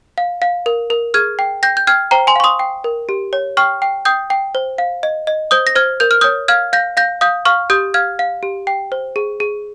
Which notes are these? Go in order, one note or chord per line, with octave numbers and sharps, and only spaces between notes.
F5
F5
A#4
A#4
G#4 F6 G#6
G5
G5 G6 A#6
G6
G5 F6 G#6
C5 G5 A#5
G#5 C6
F5 C#6
C6 D#6
G5
A#4
G4
C#5
G5 C#6 F6
G5
G5 D#6 G6
G5
C5
F5
D#5
D#5
C5 D#6 G6
A#6
C5 F6 G#6
A#4 G6
F6
C#5 D#6 G6
F5 F6 G#6
F5 G6 A#6
F5 G6 A#6
F5 D#6 G6
F5 C#6 F6
G4 D#6 G6
F5 F6 G#6
F5
G4
G5
C5
G#4
G#4